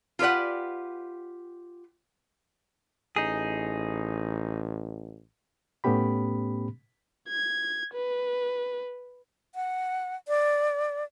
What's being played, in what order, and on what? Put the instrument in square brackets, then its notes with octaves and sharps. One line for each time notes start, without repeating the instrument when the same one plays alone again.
[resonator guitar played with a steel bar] F4 G4 B4 D5 F#5
[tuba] A1 [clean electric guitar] D#4 G#4
[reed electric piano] A2 A3 B3 C#4 G4 B5
[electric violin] G#6
B4
[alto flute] F#5
D5